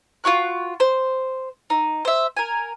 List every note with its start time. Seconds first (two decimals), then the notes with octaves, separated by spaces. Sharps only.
0.24 F4 F#4 C#6 F#6
0.80 C5
1.70 D#4
2.05 C5 E5
2.37 A#4 G#5